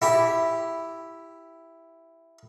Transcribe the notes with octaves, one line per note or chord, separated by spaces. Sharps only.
E4 G4